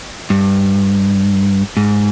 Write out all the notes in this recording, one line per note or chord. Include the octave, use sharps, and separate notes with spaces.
G2
G#2